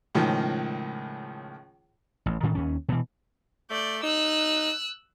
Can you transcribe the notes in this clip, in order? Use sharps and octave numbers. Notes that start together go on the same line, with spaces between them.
C#2 A2 D#3 F3
A1
A2 D#3 C#4
D#2 C#4
B2 E3
A3 D5 G6
D#4 E6 F#6